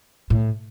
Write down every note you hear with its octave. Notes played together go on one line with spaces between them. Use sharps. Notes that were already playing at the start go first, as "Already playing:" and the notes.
A2